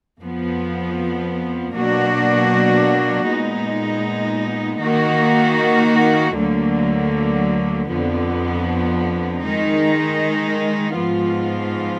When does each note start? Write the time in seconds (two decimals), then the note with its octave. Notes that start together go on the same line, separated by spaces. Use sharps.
0.20 F2 F3 B3
1.74 B2 F#3 A#3 D4 F#4
3.28 A#2 G#3 B3 D#4
4.82 D#3 A#3 D#4 F#4
6.36 D2 D3 F#3 A#3
7.89 F2 D3 F3 B3
9.43 D#3 G#3 D#4
10.96 G#2 F3 B3 F4